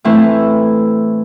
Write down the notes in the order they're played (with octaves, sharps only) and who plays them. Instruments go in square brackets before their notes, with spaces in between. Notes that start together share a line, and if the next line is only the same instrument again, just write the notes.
[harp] A2 E3 A3 C4 E4